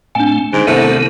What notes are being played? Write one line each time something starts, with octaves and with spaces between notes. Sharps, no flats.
A2 A3 C4 D4 G#5
G#2 D3 G3
C2 D#3 A3 B3 C5